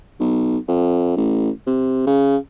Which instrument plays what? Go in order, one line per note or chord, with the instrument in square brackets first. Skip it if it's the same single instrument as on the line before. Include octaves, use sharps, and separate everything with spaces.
[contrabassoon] B1
F2
A1
C3
C#3